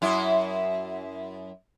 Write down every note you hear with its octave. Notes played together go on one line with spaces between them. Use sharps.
F#2 E4